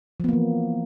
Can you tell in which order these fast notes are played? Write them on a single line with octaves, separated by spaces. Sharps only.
F3 B3 A#3 E3